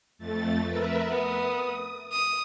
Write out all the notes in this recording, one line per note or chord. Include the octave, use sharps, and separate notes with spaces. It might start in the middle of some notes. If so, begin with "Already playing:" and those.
F2 A3 A6
A#4 B4 E5
B3 D#6
D#6